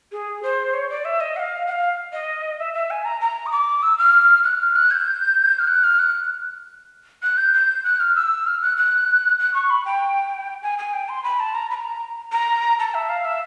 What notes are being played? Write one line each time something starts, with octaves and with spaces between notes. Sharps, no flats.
G#4
C5
C#5
D5
E5
D#5
F#5
F5
F#5
F5
D#5
E5
E5
G#5
A#5
A#5
D#6
D6
E6
F6
F#6
F6
F#6
G#6
G6
F6
F#6
F6
F#6
F#6
G6
G6
F#6
F6
E6
F6
F#6
F#6
F#6
C#6
B5
G5
G#5
G#5
G5
C6
B5
A5
A#5
B5
A#5
A#5
A5
E5
F5
E5